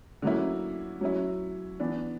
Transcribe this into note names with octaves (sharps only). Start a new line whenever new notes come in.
D3 F#3 A#3 C#4 E4
F#3 C#4 E4
E3 B3 D4